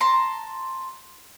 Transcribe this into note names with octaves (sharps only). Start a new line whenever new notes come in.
A5 A#5 C6